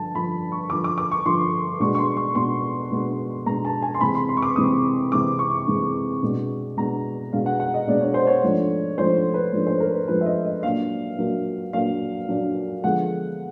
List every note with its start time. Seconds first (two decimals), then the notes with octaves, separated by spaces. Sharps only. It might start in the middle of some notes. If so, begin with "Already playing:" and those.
Already playing: G2 D3 F3 A5
0.15 G2 D3 F3 B5
0.52 C#6
0.70 G2 D3 F3 D6
0.84 D6
0.98 D6
1.11 C#6
1.26 G2 D3 F3 C6
1.80 B2 G#3 B3 D4 C#6
1.95 C#6
1.99 C6
2.17 C#6
2.35 B2 G#3 B3 D4 C6
2.91 B2 G#3 B3 D4
3.46 B2 G#3 B3 D4 A#5
3.65 A5
3.82 G#5
3.94 C6
4.01 C3 E3 G#3 C4 B5
4.15 C6
4.29 C6
4.37 C#6
4.42 D6
4.56 C3 E3 G#3 C4 D#6
5.12 C3 E3 G#3 C4 D6
5.39 C#6
5.67 C3 E3 G#3 C4
6.23 B2 G#3 B3 D4
6.77 B2 G#3 B3 D4 A#5
7.32 B2 G#3 B3 D4 F5
7.46 F#5
7.60 F#5
7.74 D#5
7.87 B2 G#3 B3 D4 D5
8.01 C#5
8.14 C5
8.27 C#5
8.43 G#2 F3 A3 D4
8.98 G#2 F3 A3 D4 C5
9.34 B4
9.53 G#2 F3 A3 D4
9.67 C5
9.80 A#4
9.95 B4
10.08 G#2 F3 A3 D4 B4
10.21 E5
10.26 D#5
10.45 D#5
10.63 A#2 F#3 A#3 D4 F5
11.18 A#2 F#3 A#3 D4
11.73 A#2 F#3 A#3 D4 F5
12.28 A#2 F#3 A#3 D4
12.84 D3 F3 G#3 B3 F#5